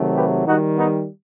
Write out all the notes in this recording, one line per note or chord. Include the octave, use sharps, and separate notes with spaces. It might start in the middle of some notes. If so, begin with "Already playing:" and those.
Already playing: C3 D#3 F#3 A3
G4 B4
D#3 G3 D#4 F#4
B3 D#4